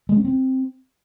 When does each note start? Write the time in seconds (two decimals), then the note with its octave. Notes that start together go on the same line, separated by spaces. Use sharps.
0.09 G#3
0.17 C#4
0.25 C4